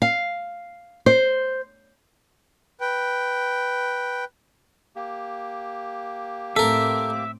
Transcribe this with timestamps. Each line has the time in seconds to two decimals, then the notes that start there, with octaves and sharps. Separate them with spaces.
0.02 F5
1.06 C5
2.81 B4 G5
4.96 A#3 G4
6.56 A2 C4 A4 A#4 E5 D6